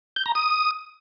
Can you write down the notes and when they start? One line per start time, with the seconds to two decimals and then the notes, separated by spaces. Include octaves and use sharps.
0.16 G6
0.26 A#5
0.35 D#6